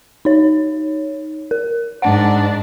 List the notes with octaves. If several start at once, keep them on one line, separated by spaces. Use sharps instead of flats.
D#4 C#5
A#4
G#2 D4 F#5